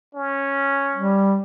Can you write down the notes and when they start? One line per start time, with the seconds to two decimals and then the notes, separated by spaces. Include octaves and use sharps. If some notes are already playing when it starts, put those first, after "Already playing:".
0.15 C#4
0.95 G3